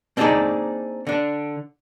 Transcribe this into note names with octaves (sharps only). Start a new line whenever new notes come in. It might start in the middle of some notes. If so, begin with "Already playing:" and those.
A#3 C4 D4 D#4 G#4 D5
D3 D4